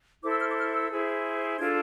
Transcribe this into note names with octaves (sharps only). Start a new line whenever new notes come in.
E4 A4 C5 D6
E6
F6
D6
F6
E6
E4 G#4 C5
D4 F4 A4 G#6